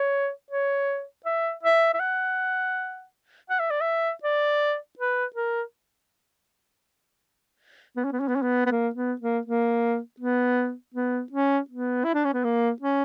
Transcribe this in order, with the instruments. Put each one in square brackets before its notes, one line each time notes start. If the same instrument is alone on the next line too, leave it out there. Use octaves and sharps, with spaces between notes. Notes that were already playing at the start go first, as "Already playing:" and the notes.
Already playing: [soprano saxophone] C#5
C#5
E5
E5
E5
F#5
F#5
E5
D5
E5
D5
B4
A#4
B3
C#4
B3
C#4
B3
C#4
B3
B3
A#3
B3
A#3
A#3
B3
B3
C#4
B3
E4
D4
C#4
B3
A#3
C#4